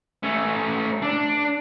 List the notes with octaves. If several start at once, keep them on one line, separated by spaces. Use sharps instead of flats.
A3 C#4
D4